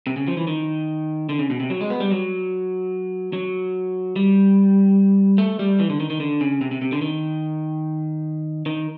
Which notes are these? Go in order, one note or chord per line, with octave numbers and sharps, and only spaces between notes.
C3
C#3
F3
E3
D#3
D3
C#3
B2
C3
F#3
G#3
B3
G3
F#3
F#3
G3
A3
G3
E3
D3
D#3
D#3
D3
C#3
C3
C3
C3
D3
D#3
D#3